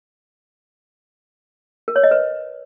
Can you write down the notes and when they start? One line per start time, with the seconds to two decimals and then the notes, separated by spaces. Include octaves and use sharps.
1.88 A#4
1.96 C#5
2.03 D#5
2.11 B4